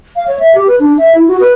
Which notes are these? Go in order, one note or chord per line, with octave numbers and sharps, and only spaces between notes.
F5
C#5
E5
G4
B4
D4
E5
E4
F#4
B4